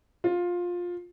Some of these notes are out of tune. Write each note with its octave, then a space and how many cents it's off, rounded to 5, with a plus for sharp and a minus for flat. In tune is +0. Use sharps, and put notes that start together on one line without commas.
F4 +15